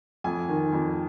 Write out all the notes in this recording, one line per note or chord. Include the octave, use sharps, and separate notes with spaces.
F2 G#5
D#3
F2